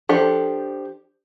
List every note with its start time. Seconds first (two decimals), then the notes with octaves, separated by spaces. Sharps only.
0.09 F3 D4 G4 A4